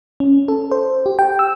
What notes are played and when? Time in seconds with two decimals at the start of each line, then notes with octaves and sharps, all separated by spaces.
0.20 C#4
0.48 A4
0.72 C5
1.06 G4
1.19 G5
1.39 E6